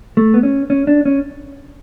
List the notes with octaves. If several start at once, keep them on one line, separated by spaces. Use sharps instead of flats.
A3
B3
C#4
C#4
D4
C#4